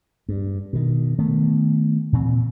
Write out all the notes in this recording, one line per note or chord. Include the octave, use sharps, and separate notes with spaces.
G2
B2 D#3
D#3 A3 B3
A#2 E3 C4